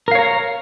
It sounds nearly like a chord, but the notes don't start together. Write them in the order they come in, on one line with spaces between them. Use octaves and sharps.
A#4 F5 C#5 A#5